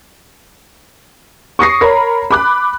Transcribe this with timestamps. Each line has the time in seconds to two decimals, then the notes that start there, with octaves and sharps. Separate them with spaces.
1.59 C#6 D#6 A#6 C7
1.81 A#4 C#5 A#5 B5
2.31 B5 D6 F#6